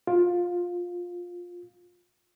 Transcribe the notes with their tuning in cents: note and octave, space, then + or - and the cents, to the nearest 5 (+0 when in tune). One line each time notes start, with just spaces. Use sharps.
F4 +15